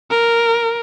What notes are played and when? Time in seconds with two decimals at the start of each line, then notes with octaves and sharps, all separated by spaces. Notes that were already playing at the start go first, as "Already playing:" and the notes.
0.10 A#4